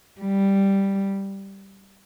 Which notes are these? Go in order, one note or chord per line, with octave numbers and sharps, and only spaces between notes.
G3